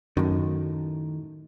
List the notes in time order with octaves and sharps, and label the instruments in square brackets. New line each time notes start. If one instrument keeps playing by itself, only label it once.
[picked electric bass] F#2 [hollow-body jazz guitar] A2 D#3